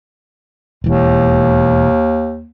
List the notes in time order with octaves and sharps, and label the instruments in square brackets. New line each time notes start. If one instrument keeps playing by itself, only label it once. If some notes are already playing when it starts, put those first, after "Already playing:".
[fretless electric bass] E1 E3 [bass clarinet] D#2